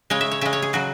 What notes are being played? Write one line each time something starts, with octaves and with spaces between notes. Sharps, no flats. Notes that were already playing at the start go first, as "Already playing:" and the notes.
C#3 G#3 C#5
E5
C#5
C#3 G#3 E5
C#5
G#4
C#3 F#3 F#4